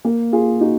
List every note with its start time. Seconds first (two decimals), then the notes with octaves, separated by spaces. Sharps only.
0.05 A#3
0.32 F4 G#4
0.61 D#4 F#4